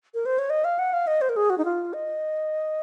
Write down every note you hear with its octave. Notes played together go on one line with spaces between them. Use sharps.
A#4
C5
C#5
D#5
F5
F#5
F5
D#5
C5
A#4
G#4
F#4
D#4
F4
D#5